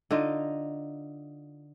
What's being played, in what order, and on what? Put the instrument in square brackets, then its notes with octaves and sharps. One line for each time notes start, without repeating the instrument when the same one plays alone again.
[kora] D3 D#4 F4 D#5